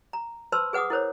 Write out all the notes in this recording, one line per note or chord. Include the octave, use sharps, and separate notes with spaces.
A#5
B4 C5 A5 B5 C6 E6
G#4 B4 F#5 D6 D#6
E4 A#4 C5 C#5